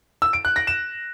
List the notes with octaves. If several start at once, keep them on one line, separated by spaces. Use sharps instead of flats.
E6
D7
F#6
A#6
E7